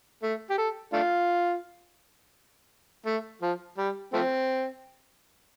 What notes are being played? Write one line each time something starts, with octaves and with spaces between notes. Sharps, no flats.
A3
G4
A4
A3 D4 F4
A3
F3
G3
F3 A3 C4